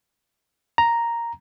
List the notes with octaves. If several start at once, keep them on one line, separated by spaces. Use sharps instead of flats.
A#5